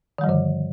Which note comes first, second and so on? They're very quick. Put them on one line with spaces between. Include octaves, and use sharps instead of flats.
D#3 G3 F3 G2 D3